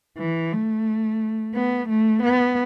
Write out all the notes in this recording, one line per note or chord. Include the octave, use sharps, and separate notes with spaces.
E3
A3
B3
A3
B3